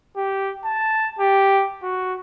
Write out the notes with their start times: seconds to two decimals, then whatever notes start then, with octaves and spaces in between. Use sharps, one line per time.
0.16 G4
0.65 A5
1.19 G4
1.83 F#4